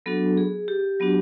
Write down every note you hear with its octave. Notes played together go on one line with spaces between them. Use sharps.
F#3 B3 D4 F#4 A4
G#4
G4
F#3 B3 D4 F#4